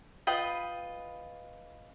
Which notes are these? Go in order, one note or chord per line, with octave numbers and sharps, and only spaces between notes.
F4 B4 D#5 G5